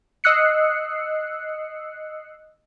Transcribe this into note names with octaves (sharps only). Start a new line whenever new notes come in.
D#5 D#6 E6 F#6 C7 C#7